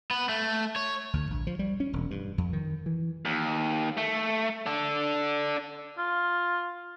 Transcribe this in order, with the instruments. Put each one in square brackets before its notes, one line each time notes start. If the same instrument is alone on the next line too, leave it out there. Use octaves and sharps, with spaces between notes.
[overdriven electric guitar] B3
A3
C#5
[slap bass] D2
A#1
F3
G3
C#4
E1
G2
F2
D#3
E3
[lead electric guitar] D#2
A3
D4 A4
[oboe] F4